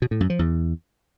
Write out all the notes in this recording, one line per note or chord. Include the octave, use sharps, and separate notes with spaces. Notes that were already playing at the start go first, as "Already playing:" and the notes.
B2
A2
F#2
F3
E2